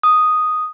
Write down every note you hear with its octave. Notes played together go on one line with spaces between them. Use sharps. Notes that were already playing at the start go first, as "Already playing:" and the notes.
D#6